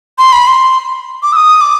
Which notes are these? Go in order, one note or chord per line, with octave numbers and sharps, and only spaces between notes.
C6
B5
C6
D6
E6
D#6
D6